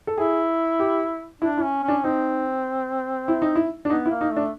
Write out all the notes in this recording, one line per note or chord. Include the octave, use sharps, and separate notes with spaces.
A4
E4 G#4
G4
D4 E4
E4
C#4
C#4 D4
C4 D#4
E4
D#4
E4
D4
B3 D#4
E4
A#3
D#4
A3 D4